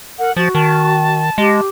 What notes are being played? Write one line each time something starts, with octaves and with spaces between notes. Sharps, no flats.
A#4 F#5
F3 F#4 A6
D#3 A5
G#3 G4